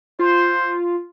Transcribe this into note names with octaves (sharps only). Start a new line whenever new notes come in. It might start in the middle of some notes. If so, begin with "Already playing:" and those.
F4 C5